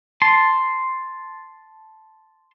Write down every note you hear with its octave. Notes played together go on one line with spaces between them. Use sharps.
A5 C6